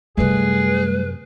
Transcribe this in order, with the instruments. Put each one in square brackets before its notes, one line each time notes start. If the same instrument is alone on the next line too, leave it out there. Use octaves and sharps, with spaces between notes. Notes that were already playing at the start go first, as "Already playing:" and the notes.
[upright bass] F#2 C3 [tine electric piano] G3 A3 [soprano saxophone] G#4 [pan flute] B4